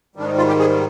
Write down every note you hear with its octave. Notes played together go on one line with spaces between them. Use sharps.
G#2 D#3 G3 D4
D#4
F4
G4
G#4